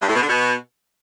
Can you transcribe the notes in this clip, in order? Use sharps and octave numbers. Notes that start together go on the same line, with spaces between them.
G2
A2
B2
D3
B2